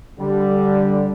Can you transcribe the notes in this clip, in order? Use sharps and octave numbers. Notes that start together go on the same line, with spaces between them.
D3 G3